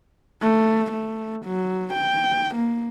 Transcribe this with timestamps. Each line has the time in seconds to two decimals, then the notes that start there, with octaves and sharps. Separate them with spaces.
0.42 A3
0.92 A3
1.45 F#3
1.93 G5
2.55 A#3